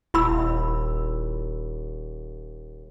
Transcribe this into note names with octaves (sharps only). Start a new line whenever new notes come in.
D#1 E4 B5 E6